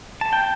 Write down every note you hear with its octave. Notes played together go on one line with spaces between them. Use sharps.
A5
G5